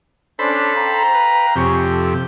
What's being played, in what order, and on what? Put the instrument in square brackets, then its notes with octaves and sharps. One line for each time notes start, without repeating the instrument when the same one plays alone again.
[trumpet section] C#4 D4 [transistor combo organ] A4 C5 B5
[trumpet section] F5 G5 A#5
[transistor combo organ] B4
[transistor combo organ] F2 C3 G4 [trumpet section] G#4 C#5
[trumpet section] A4